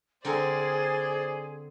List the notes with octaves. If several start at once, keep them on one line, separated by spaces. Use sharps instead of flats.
D3 C4 G#4 A#4 C5 D5